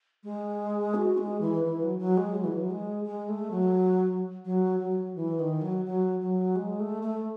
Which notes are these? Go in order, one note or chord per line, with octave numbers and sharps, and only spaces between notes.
G#3
F#4
G#3
E3
E3
F#3
F#3
G#3
F#3
E3
F#3
G#3
G#3
A3
F#3
F#3
F#3
E3
D#3
F#3
F#3
F#3
G#3
A3
A3